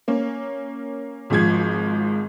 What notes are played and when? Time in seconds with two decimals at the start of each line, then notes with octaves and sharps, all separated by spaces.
0.08 A#3 C#4
1.30 G#1 G#2 F3 G#6